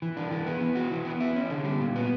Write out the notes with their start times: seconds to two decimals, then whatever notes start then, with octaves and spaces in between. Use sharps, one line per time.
0.02 E3
0.17 D4
0.31 E3
0.46 B3
0.61 E3
0.75 F#4
0.91 E3
1.05 B3
1.20 E4
1.36 C#4
1.50 D3
1.65 G3
1.80 A#2
1.96 B3